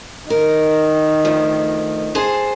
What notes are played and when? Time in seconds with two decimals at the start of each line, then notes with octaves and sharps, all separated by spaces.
0.30 D#3 A#4
1.25 D2 F3
2.15 G#4 C5 A5